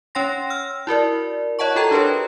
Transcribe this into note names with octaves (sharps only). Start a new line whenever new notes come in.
C#4 C#5 G5 C6 A#6
E6 F6
E4 F#4 A#4 D5
C#5 D#5 F#5 A5 C#6
F4 F#4 A4 G5 A#5 G#6
D4 G4 A#4 B4 C#5